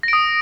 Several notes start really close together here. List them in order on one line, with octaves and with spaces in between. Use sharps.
A#6 D7 D#6